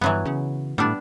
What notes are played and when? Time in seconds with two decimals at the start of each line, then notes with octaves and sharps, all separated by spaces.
0.01 G2 E3 F#3 B3
0.25 C#3
0.78 A2 G3 B3 D4